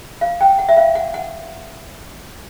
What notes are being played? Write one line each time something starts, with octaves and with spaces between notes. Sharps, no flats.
F5
G5
F#5
E5
F5
F#5
F#5